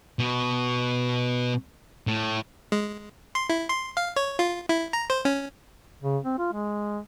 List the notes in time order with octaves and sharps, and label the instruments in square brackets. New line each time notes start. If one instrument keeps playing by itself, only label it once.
[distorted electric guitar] B2
A2
[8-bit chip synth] G#3
C6
E4
C6
F5
C#5
F4
E4
A#5
C5
C#4
[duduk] C#3
C4
F4
G#3